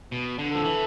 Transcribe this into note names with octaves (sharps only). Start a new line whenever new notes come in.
B2
D3
F3 A4
E3